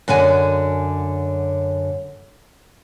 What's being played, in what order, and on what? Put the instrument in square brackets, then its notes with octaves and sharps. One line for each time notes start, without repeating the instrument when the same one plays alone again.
[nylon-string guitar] F#2 D3 D5 G#5